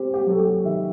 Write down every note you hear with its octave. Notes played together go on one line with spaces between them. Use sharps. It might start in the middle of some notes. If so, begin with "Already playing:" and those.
Already playing: C4 G4
G4
F#3 A4
G4
D#3 E5